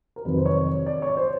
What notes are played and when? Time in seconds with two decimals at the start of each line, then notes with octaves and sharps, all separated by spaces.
0.16 A#4
0.25 F2 C3 D#3 F#3 B4
0.37 C5
0.46 C#5
0.86 D5
1.02 C#5
1.17 C5